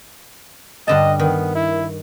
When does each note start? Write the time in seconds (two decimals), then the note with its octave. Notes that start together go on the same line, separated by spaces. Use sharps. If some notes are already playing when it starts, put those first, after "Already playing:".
0.88 G2 D3 D#5 A5
1.19 D#3 B3
1.55 E4